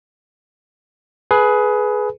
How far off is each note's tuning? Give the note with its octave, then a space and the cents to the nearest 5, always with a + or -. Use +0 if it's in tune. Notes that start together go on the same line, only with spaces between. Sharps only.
G#4 +20 B4 +0